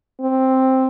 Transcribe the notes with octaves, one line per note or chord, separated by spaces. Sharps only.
C4